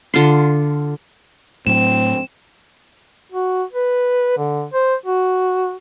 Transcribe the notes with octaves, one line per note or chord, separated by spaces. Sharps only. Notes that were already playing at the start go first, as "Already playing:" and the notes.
D3 F4 C6
A2 F#3 C4 E7
F#4
B4
D3
C5
F#4